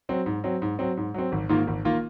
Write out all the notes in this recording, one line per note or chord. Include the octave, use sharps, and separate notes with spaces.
F#3 C4
G#2
F#3 C4
G#2
F#3 C4
G#2
F#3 C4
G#1
G#2 D#3 A#3 F4
G#1
D#3 A#3 F4